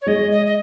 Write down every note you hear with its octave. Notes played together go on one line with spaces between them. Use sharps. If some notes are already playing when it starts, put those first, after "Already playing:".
C#5
G#3 D#5
D#5
D#5